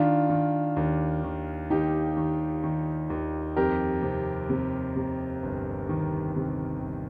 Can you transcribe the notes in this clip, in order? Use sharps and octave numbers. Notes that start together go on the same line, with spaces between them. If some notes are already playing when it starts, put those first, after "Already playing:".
Already playing: D#3 D4 F4
D#3
D#2
D#3
D#2 D#4 G4
D#3
D#3
D#2
F2 G4 A#4
C3
C3
C3
G1
D#3
C3
G1